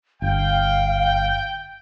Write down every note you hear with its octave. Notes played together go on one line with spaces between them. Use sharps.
G1 F5 G5